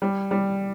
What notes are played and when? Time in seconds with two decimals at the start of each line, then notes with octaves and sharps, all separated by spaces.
0.02 G3
0.31 G3